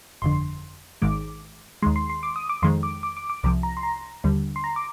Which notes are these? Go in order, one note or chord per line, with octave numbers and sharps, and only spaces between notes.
G1 F2 D3 C6
G#1 G#2 D#3 G#3 D6
D#2 D#3 G#3 C6
C6
C6
D6
D#6
D6
F2 D#3 G#3 C6
D6
D6
D6
D6
C2 C3 F3 D6
A#5
C6
A#5
D#2 D3 G3
C6
A#5
D6